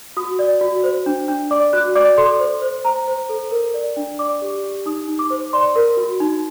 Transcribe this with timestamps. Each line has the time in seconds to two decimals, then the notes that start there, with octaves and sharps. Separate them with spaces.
0.17 F#4 D#6
0.39 D5
0.61 F#4
0.84 C5
1.06 D4
1.28 D4
1.51 D5 D6
1.73 F#4 F#6
1.95 D5 D6
2.17 A4 C6
2.40 C5
2.62 C5
2.85 C5 A#5
3.08 C5
3.29 A4
3.51 A#4
3.74 D5
3.97 D4
4.19 D5 D6
4.42 G4
4.64 G4
4.86 D#4 D#6
5.08 D#4
5.19 D6
5.30 C5
5.53 D5 C6
5.76 A#4
5.97 F#4
6.20 D#4